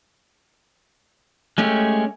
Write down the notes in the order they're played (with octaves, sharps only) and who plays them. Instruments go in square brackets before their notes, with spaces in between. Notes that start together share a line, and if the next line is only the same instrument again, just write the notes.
[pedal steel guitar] G#3 A3 C#4 G4